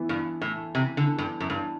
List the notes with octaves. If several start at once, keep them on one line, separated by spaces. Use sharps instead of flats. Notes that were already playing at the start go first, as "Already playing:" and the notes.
Already playing: E3 B3 E4
G2
A2
C3
D3
G2
F#2
G2